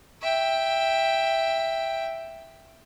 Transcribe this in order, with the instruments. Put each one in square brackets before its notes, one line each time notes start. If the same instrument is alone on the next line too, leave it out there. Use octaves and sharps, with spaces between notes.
[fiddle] E5 G5